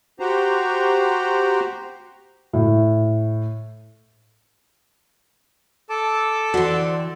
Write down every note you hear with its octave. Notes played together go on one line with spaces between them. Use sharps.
F#4 G4 C5 A#5
A2
A4 A5 D6
D3 E3 C4 F#4